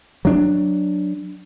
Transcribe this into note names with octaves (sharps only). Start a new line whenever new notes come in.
F#3 D4